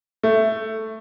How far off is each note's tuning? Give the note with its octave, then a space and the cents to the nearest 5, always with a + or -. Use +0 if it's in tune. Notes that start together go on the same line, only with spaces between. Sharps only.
A3 +5